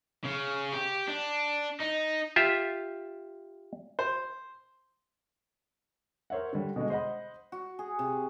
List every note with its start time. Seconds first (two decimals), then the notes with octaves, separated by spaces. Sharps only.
0.25 C#3
0.74 G4
1.08 D4
1.80 D#4
2.36 F4 G4 E5
3.99 C5
6.30 A#4 C5 C#5 E5 F#5
6.53 D3 G3 D4
6.76 B2 D3 G#3
6.90 C5 D#5 F#5 B5
7.52 F#4
7.79 G#4
7.99 C3